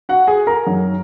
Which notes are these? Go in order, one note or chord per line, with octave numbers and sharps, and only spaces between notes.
F#4 F#5
G#4 G#5
A#4 A#5
F#2 D#3 F#3